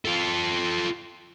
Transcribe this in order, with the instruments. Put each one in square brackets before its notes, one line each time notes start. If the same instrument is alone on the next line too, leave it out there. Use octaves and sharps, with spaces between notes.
[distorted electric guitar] F4 A4